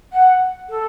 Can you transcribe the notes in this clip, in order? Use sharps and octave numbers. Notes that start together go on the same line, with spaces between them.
F#5
A4